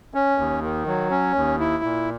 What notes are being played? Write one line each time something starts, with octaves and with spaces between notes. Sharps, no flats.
C#4
D#2
D#3
F#3
C#4
D#2
E4
A#2